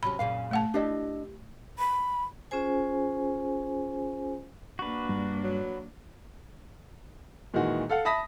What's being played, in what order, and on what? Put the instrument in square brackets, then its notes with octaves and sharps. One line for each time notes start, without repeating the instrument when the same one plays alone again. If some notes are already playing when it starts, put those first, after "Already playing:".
[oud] C3 F#3 C#4 [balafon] B5
[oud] F#2 A#2 C#3 [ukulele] F5
[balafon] A3 F#5 A5
[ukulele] D4 D#5 [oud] E4 G4
[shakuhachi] B5
[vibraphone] C#4 F4 G#4 C5 G#5
[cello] A#3 D4 [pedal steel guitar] F#4 B4
[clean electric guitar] G2
[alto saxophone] F#3
[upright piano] A#2 D#3 E3 G#3 F#4
A4 F5 F#5
E5 A5 B5 D#6 A#6 B6